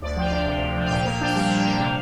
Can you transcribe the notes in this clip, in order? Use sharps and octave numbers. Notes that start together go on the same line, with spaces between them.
D2 D5
F3 G5
F5
D4
C3
D2
F3
F5
A#2 G5
F5
A#3
D4 G5
G3 F5
A#2
A#3
C3